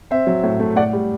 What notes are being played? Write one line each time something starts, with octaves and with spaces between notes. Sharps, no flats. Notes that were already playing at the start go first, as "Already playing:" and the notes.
C4 C5 E5
F#3
A2
A3
A2 D5 F#5
G3